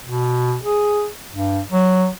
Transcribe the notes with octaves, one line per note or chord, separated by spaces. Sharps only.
B2
G#4
G2
F#3